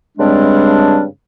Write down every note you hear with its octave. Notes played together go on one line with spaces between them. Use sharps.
G2 C#3 G3 G#3 C4 D4